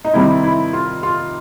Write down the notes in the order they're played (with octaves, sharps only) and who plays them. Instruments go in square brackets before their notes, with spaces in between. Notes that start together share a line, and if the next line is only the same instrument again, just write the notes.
[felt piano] D#4
[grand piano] C3 D#3 G3 C4 [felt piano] E4
[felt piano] E4
F4
F4